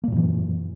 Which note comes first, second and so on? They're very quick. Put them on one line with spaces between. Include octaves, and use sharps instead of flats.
A#3 A#2 F#2 E3